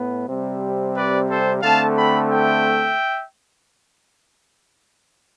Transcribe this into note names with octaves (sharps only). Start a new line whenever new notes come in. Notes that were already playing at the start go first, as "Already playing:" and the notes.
Already playing: A2 B3
C3 G3 C4
B4 D5
A4 C5
D3 A3 C4 F5 A5
G5 B5
E5 G5